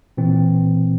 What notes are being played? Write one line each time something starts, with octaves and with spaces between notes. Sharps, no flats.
A#2 E3 C4